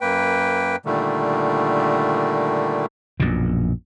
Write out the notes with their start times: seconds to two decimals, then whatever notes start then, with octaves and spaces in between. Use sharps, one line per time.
0.01 F#2 A#3 B4 G5
0.86 A#2 D3 D#3 G3 A3
3.20 A#1 F#2 B2